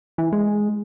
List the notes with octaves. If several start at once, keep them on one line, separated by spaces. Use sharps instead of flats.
E3
G#3